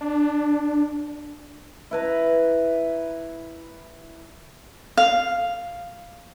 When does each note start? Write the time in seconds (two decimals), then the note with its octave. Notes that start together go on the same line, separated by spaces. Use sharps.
0.01 D4
1.91 E4 B4 A#5
4.98 F5